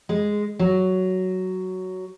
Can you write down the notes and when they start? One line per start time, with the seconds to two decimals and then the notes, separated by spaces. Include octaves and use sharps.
0.09 G#3
0.59 F#3